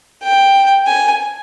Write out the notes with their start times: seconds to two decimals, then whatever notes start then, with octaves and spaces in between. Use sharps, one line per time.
0.23 G5
0.87 G#5